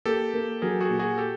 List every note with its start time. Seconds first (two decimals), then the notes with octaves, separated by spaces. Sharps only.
0.05 A#3 G4 A4
0.34 A#3
0.62 F#3 G#4 A#4
0.81 F#4 G#4
0.90 A#2
0.99 F#4 G#4
1.18 G4 A4